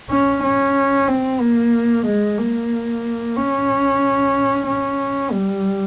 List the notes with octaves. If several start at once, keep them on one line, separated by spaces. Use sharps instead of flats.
C#4
C#4
C4
A#3
G#3
A#3
C#4
C#4
G3